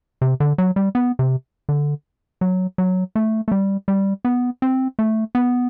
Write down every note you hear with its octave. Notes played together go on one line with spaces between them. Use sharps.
C3
D3
F#3
G3
B3
C3
D3
F#3
F#3
A3
A3
G3
G3
B3
C4
A3
B3